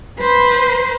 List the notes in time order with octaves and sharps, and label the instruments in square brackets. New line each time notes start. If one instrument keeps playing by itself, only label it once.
[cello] B4 C5